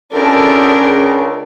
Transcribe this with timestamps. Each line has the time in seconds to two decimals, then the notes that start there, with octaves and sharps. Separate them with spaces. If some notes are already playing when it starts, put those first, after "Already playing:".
0.12 G#1 E2 C#4 D4 A4 A#4
0.76 C#2 C#3